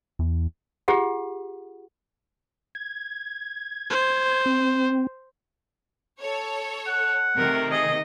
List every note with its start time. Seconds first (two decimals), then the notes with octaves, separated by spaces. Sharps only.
0.19 E2
0.88 F4 G4 G#4 F#5
2.75 G#6
3.90 C5
4.46 C4
6.19 A4 C#5
6.87 F#5
7.37 C3 D#3 A3 A#4
7.71 G#4 D#5